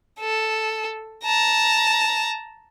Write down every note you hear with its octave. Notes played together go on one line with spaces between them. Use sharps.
A4
A5 A#5